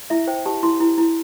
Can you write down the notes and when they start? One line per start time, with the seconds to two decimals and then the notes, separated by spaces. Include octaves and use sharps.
0.10 E4 E5
0.27 C5 G5
0.46 G4 A5
0.63 E4 C6
0.80 E4
0.98 E4